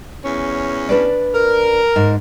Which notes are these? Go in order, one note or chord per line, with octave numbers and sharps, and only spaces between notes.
E2 C#4
D4 B4 D5
A#4
G#2